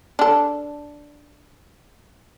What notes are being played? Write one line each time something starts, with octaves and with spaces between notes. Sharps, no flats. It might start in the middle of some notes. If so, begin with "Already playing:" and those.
D4 A4